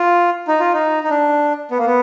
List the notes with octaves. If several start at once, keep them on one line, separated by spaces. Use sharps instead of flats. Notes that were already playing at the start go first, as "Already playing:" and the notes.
Already playing: F4
D#4
F4
D#4
D#4
D4
B3
A#3
B3